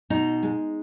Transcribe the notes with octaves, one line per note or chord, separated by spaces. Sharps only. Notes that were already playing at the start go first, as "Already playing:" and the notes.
B2 D#4
G#3